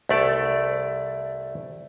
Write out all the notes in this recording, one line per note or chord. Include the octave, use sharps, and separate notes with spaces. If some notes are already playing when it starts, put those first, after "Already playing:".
C2 A3 D5